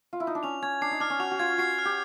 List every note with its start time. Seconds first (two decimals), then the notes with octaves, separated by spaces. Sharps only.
0.13 F4
0.20 E4
0.27 D#4
0.35 D4
0.43 C#4 F7
0.62 C#4 G#6
0.81 D4 C7
0.91 D#4
1.00 D4 F6
1.10 C#4
1.20 F#4 F7
1.31 F#4
1.39 F4 G#6
1.58 F#4 C7
1.79 F6
1.85 G4